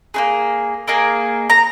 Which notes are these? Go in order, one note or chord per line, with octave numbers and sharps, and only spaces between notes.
A#3 D#4 G#4
A#3 D#4 G#4
A#5